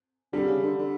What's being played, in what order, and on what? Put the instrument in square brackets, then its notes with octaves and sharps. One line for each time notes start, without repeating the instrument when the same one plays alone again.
[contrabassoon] D3 [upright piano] G3
[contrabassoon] C#3
D3
D3